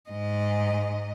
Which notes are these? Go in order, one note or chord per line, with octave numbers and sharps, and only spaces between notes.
G#2 D#5